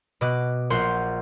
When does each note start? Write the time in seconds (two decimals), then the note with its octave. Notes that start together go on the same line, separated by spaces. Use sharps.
0.21 B2 D#5 D6 F#6
0.70 A#1 A#3 F4 F#5 C6 G6